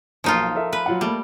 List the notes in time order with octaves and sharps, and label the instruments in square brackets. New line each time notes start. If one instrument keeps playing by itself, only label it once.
[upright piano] B1 A#3 [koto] F3 D#4 F4
[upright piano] A4 A#4 E5
[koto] B4
[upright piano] F#3 F4 F#5
[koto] G3 [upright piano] A3 A#3